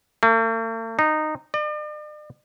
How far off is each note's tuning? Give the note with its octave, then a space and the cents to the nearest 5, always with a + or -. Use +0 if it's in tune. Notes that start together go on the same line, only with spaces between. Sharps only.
A3 +45
D#4 -15
D5 +45